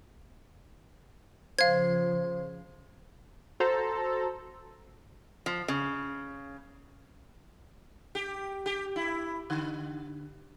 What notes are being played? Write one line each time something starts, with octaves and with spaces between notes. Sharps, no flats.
C#3 F3 C5 F5 G#6
F#4 A4 C5 A#5
F3
C#3
G4
G4
E4
D3